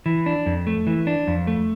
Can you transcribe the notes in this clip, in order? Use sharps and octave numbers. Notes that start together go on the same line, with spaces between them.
E3
D4
F2
A3
E3
D4
F2
A3